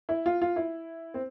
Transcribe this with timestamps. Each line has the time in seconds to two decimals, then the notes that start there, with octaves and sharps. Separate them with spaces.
0.09 E4
0.26 F4
0.42 F4
0.56 E4
1.14 C4